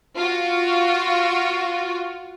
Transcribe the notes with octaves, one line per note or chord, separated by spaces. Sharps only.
F4 F#4